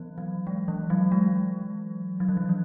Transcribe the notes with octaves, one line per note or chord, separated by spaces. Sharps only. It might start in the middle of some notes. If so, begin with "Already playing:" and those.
Already playing: E3 F#3 B3
F#3
G#3
E3
F#3
G#3
F#3
E3
F#3
E3